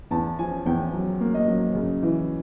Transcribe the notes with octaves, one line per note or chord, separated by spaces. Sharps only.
E2 A5
F3 G#5
E2 G5
F#3
A#3
D#5
F#3
C#3
E3